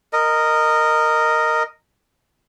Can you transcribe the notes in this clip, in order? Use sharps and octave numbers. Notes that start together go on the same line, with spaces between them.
A#4 D#5